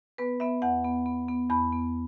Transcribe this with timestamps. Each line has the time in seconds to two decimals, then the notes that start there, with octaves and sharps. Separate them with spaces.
0.18 B3 B4
0.40 B3 E5
0.62 E2 F#5
0.85 B3
1.06 B3
1.29 B3
1.50 E2 B5
1.72 B3